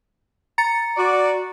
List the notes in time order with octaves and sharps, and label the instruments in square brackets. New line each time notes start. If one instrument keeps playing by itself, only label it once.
[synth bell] A#5 A6 C#7
[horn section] F#4 D5